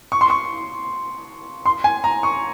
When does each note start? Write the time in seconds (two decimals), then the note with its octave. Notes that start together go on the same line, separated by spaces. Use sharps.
0.12 C#6
0.21 C6
0.30 C#6
1.66 C6
1.84 G#5
2.04 A#5
2.23 C#6